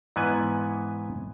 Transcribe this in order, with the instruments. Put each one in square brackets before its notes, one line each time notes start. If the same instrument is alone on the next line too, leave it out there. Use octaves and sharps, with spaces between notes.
[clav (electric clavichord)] G#2 E3 B3 C#4 B4 G#5